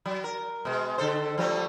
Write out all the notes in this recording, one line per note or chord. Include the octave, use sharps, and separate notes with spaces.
F#3
A#4
B2 G#3
D3 A4 C5
F3 G3 A3